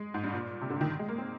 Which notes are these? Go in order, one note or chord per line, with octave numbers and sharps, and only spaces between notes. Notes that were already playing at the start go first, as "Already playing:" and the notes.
Already playing: G#3
G#2
G2
A#2
C3
D3
D#3
G#3
A#3
C4